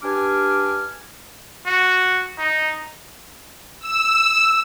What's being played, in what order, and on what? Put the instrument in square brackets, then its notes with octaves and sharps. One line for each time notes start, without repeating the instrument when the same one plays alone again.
[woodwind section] G2 D4 G4 G#5 D6 F6
[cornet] F#4
D#4
[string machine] E6